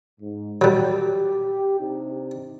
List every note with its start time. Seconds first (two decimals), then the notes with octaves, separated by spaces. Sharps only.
0.21 G#2
0.61 F#3 G3 G4
1.80 C3 D4 D#4